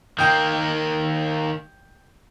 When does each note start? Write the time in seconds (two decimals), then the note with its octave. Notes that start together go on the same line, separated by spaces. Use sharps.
0.19 D#3 A#3 G5 D#6 G6